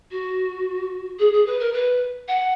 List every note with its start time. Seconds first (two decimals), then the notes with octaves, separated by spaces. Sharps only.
0.11 F#4
1.19 G#4
1.33 G#4
1.46 B4
1.60 A#4
1.73 B4
2.28 F#5